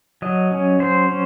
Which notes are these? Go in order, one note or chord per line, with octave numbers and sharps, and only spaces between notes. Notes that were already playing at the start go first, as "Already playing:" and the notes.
F#3 D#5
C#4
F#3 C5
C#4